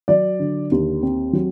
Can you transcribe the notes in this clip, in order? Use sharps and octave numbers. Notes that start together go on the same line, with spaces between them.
F#3 D5
D3
D#2
C4
F#3